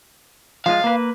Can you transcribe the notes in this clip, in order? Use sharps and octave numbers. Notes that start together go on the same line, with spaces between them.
F3 G#3 F4 F5
A#3 B4